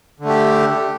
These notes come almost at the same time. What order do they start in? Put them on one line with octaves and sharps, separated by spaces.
D3 A3 G4